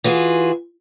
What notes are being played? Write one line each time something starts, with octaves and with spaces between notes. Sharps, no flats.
E3 F4 F#4 G#4